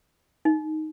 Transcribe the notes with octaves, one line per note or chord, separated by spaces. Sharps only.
D#4